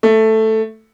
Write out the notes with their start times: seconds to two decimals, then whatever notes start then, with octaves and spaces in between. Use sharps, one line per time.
0.03 A3